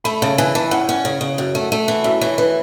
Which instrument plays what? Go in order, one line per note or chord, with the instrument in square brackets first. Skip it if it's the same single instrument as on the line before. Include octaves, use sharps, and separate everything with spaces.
[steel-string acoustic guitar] A3 [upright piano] B5
[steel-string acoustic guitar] C#3 [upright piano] A5
[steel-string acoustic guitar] E3 [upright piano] G#5
[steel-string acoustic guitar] E3 [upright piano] A5
[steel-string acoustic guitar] A2 [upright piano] F#5
[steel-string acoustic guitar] C#4 [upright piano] F#5
[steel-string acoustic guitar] C#3
C#3
F#2
A3
A3
E3
[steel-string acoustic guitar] F#2 [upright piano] E5
[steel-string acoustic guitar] E3 [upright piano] C#5
[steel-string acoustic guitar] E3 [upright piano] B4